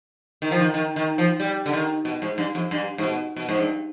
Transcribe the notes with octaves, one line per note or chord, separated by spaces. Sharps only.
D#3
F3
D#3
D#3
D#3
F3
G3
D3
D#3
B2
G#2
G2
F2
G2
G#2
B2
B2
G#2
G2